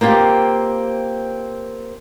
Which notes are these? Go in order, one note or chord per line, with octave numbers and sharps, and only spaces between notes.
A#3 C4 F4 G4